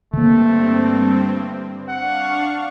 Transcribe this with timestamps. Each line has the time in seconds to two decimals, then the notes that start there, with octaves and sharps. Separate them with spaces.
0.13 G2 D3 A3 A#3 C4
1.89 D4 F5 F#5 C#6